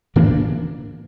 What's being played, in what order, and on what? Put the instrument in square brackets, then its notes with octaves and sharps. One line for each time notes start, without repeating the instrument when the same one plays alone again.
[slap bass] A2 E3 A#3 D4